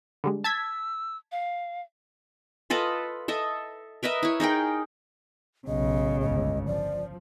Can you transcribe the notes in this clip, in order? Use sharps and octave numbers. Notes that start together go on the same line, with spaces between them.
D3 G3 G#3
A5 E6 G#6 B6
F5
F4 A4 B4 D#5
A4 D#5 E5
A#4 B4 D#5 E5
E4 C#5
D#4 G#4 A#4 G5
B1 A2 C#3 D#5
G1 C#2 D#5
F3 D5